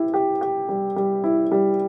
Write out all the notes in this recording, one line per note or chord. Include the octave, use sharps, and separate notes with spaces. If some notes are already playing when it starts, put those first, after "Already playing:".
Already playing: E4 G4
G4
G4
G3
G3
E4
G3